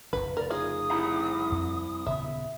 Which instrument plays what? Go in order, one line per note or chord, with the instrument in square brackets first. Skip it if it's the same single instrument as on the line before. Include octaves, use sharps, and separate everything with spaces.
[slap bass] F1 A#1 C#3 [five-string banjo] B4
[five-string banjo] A#4 [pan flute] D5
[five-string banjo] D#4 F4 G#4 [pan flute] D#6
[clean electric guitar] C2 E4 A#5
[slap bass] F2
[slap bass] D#1 C#3 B3 [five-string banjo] E5